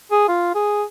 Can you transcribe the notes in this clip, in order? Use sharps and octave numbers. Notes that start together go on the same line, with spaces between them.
G#4
F4
G#4